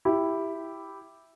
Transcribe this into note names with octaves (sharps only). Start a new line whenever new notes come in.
E4 G4